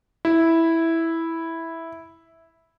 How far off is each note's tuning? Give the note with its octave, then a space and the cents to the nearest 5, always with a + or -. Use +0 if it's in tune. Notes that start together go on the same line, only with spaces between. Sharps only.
E4 -5